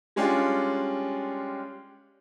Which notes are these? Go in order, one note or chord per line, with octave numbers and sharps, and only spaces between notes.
G3 G#3 C#4 D4 F4 G4